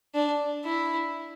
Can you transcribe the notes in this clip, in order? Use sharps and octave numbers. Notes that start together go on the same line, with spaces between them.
D4
E4